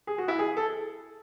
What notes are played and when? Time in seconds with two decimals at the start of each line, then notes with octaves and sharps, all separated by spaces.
0.07 G#4
0.18 F#4
0.28 E4
0.39 G#4
0.57 A4